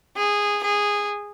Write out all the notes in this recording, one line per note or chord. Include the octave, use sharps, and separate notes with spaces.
G#4
G#4